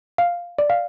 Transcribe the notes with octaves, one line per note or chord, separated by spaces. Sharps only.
F5
D5
F5